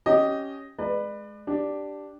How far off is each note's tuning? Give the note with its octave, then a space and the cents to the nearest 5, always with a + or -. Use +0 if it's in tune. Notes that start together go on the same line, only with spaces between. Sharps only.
C#4 +0 G4 -15 D#5 +0
G#3 +20 B4 +0 D5 +35
D4 +0 G4 -5